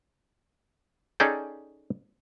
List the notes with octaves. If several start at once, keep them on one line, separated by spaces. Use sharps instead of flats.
C#4 D#4 G#4 A4 D5 G5